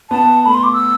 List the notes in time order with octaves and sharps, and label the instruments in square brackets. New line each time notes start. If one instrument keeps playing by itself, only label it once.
[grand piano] B3 [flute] A5
[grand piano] A3 [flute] B5
[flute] C6
D6
E6